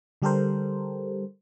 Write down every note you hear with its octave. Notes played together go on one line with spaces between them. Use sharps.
D3 G3 G4 A4 A#4 C5